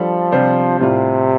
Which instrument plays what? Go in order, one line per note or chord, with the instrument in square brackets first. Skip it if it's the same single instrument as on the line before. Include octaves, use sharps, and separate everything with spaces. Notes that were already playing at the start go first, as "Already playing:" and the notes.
Already playing: [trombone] F3 [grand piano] G3 D4 A4
[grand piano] C3 G3 D4 F4 C5
[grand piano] A2 G3 F4 D5 [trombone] C3